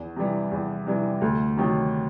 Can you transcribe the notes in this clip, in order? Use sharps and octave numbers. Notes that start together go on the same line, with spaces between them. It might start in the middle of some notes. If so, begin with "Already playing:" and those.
Already playing: E2
C3 E3 G3
E2
C3 E3 G3
D2
C3 D#3 F#3